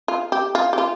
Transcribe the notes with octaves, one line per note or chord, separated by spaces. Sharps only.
F4
G4
F4
G4
F4